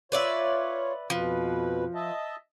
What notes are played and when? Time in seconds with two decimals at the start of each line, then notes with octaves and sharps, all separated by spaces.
0.12 F4 B4 C#5 D5 E5
1.10 F2 B2 F3 B4
1.95 D#5 E5 A5